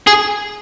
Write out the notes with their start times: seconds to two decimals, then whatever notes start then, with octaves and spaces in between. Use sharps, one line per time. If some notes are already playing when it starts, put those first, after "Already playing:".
0.07 G#4